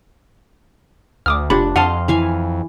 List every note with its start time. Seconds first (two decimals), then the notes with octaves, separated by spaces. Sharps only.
1.26 D2 D6 D#6 F6
1.50 F1 D4 F4 G4 B5
1.76 F2 D#5 F5 F#5 A5 C6
2.08 E3 F5 G#5